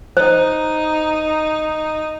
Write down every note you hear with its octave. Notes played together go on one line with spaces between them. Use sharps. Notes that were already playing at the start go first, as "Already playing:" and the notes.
D#4 C5